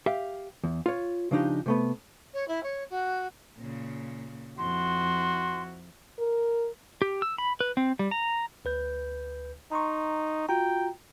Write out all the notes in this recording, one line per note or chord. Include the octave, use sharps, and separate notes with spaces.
G4 E5 F5
E2
F4 C#5
C#3 F3 D4 D#4 G4
C3 A3 B3
C#5
E4
C#5
F#4
A#2 C#3
F2 E4 F#4 C6
A#4
G4
E6
B5
B4
C4
G3
A#5
D2 B4 G6
D#4 A#5 C6 C#6
F4 F#4 G5 A#5